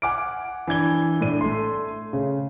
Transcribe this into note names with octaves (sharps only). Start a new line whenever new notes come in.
F#5 G#5 D6 F6 D7
E3 D4 G#6 G7
A2 D4 D#7
A3 C6
C#3